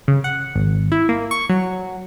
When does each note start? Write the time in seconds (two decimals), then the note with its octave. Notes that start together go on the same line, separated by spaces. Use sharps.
0.08 C#3
0.24 F#5
0.56 G#1
0.92 E4
1.09 A#3
1.31 C#6
1.49 F#3